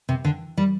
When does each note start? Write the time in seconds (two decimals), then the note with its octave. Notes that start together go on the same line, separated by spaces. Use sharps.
0.09 C3
0.25 D3
0.57 G3